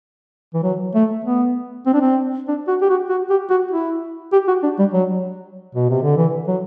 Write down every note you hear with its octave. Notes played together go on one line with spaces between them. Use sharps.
E3
F#3
A3
B3
C4
D4
C4
D4
F#4
G4
F#4
F#4
G4
F#4
E4
G4
F#4
D4
G3
F#3
B2
C3
D3
E3
F#3